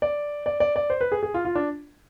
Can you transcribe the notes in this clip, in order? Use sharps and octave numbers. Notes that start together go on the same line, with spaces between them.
D5
D5
D5
D5
C5
B4
G#4
G#4
F4
F4
D4